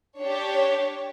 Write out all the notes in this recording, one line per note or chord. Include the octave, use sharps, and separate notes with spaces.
D4 G4 C#5